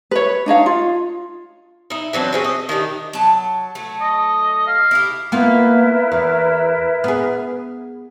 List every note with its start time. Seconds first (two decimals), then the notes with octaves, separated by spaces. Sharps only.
0.11 B4 C#5
0.46 D4 D#4 C#5 F5
0.66 F4
1.90 D#4 E4
2.13 E3 F#3 C4 D4
2.33 C4 C#4 G#4
2.44 D#5
2.69 D#3 D4 D#4 G4
3.13 F#3 A5
3.75 F#3 A3
4.01 D#5
4.67 F5
4.91 E4 G4
5.32 A#3 B3 E4 F4 A#4 B4
6.12 E2
7.04 B3 G#4